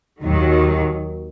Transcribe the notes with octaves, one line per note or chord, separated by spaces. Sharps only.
D#2 D#3 F#3